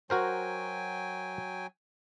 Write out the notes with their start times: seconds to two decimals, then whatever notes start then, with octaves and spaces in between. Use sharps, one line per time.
0.10 F#3 F#4 A#4 C5 G5 G#5